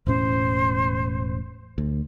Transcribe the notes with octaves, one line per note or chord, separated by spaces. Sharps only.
E1 A2 C#4 C5
D2